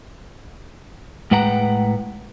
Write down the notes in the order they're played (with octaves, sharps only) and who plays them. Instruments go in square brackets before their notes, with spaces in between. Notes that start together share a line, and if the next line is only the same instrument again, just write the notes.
[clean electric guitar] A2 G#3 B4 F#5 G5 A#5